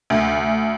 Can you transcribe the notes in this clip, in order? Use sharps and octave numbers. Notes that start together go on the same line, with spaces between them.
D2